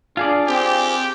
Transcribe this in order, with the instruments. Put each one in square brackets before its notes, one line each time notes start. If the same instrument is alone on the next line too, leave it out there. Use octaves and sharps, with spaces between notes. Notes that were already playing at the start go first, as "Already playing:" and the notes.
[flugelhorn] D4 [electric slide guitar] F4 G#4 D5
[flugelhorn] C4 [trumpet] G4